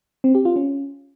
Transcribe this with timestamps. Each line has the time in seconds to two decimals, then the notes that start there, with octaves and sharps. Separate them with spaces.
0.24 C4
0.35 G4
0.45 F4
0.56 C#4